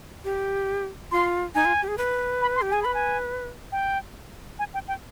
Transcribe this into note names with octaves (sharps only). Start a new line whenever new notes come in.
G4
F4 C6
D#4 G#5
F4
G4
G#4
B4
B5
C6
G4
G#4 G#5
B4 B5
G#5
G5
G#5
G5
G5